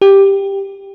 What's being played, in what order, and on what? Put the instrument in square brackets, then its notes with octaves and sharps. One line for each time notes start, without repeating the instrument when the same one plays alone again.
[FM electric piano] G4